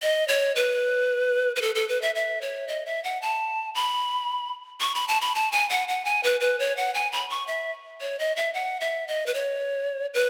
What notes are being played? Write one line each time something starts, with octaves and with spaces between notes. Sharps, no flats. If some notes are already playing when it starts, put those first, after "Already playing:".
D#5
C#5
B4
B4
A4
A4
B4
E5
E5
C#5
D#5
E5
F#5
A5
B5
C#6
B5
A5
B5
A5
G#5
F#5
F#5
G#5
B4
B4
C#5
F#5
G#5
B5
C#6
E5
C#5
D#5
E5
F#5
E5
D#5
B4
C#5
B4